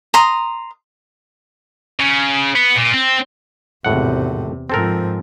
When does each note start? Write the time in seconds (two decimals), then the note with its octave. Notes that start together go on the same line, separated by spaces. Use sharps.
0.14 A#5 C6 D#6
1.99 C#3
2.56 B3
2.76 A#2
2.94 C4
3.85 G#1 E2 A2 C3 F#5
4.70 G#2 F3 C4 A4 A#4